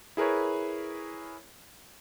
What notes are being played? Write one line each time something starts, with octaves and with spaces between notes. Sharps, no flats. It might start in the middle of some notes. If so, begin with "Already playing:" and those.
E4 G#4 A#4 B4 C#5